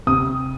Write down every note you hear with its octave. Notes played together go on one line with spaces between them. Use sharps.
C3 D#6